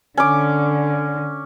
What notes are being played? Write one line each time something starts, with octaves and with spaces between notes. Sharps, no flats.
D3 C#4 D6